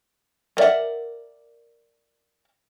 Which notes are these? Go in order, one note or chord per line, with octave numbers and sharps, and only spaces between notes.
B3 A#4 D5 E5 F#5